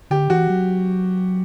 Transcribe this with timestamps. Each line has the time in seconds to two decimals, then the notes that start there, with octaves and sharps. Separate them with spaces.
0.10 D3 G4
0.30 E3 F#4
0.50 F#3